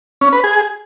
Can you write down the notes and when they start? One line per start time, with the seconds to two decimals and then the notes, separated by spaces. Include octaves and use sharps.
0.21 C#4
0.33 B4
0.44 G#4